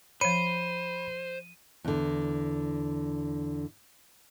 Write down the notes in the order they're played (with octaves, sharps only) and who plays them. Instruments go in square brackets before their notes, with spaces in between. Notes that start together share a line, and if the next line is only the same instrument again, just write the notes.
[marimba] F3 C#5 [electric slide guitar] C5 [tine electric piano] B5 [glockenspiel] D#7
[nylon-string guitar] E2 D3